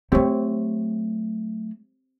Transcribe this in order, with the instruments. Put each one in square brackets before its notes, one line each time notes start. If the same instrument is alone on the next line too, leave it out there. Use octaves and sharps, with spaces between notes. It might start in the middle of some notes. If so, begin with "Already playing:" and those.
[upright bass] F#3 A3 [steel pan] C4 G4 C#5